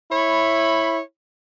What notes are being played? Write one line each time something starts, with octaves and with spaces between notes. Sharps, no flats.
E4 C#5 B5